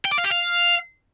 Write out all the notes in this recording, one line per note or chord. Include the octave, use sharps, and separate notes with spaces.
G5
D5
F5
G4
F5